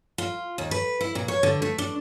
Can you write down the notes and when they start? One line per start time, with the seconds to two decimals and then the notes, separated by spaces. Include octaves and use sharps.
0.18 F4
0.58 D#2
0.71 B4
1.01 E4
1.15 A#2
1.28 C#5
1.43 D3
1.62 A3
1.78 D4